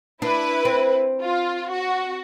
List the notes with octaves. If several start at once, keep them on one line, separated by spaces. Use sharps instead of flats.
D4 E4 B4
C4
F4
F#4